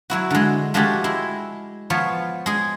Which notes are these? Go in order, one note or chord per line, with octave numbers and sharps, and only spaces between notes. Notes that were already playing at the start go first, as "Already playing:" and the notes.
F#3 E4 F#4
D3 G#3
F3 G#3 A3 F#4 G4
G#3 E4
F3 B3 C#5
G#3 G#4